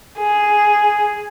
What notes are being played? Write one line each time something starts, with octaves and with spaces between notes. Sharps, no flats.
G#4